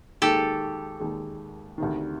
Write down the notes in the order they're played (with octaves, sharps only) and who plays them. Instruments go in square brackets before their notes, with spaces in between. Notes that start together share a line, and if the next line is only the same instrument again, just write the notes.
[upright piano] D#2 D#3 G#3 [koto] G4 A4
[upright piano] D#2 D#3 G#3
D2 C3 D#3